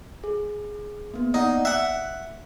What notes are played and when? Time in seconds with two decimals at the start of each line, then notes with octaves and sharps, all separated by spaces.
0.24 G#4
1.14 A#3 B3
1.34 D#4 D5 F#5
1.65 E5 F#5 F#6